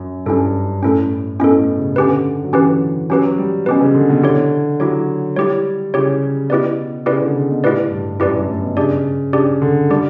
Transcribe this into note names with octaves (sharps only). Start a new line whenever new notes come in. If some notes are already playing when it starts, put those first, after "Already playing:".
Already playing: F#2
G2 C#4 E4 A4
A2 C#4 E4 A4
B2 C#4 E4 A4
A2
C#3
D3 C#4 G4 B4
F#3
E3 C#4 G4 B4
F#3 C#4 G4 B4
G3
B2 C#4 G4 B4
C#3
D3
B2
D3 E4 G4 C#5
F#3 E4 G4 C#5
G3 E4 G4 C#5
C#3 E4 G4 C#5
B2 E4 G4 B4 D5
C#3 E4 G4 B4 D5
D3
C#3
B2
A2 E4 G4 B4 D5
G2
F#2 E4 G4 B4 D5
G2
A2
B2
C#3 D4 G4 D5
C#3 D4 G4 D5
D3
G3 D4 G4 D5